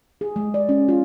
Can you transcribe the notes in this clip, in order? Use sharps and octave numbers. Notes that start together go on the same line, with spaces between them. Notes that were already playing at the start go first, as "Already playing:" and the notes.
G#4
G#3
D5
C#4
F4